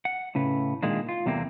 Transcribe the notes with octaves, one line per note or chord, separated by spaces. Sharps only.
F#5
A2 C#3 B4
A#2 D#3 G#3 A#3 D4
F4
E2 C3 G3 A3 A#3 C4